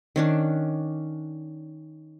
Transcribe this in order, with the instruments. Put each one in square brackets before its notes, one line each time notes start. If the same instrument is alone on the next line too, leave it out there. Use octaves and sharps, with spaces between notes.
[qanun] D#3 C#4 D4